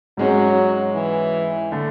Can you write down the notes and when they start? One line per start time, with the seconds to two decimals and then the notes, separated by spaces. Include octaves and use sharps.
0.17 G#2 F#3 G#3 C#4
0.95 E3
1.72 D3 A3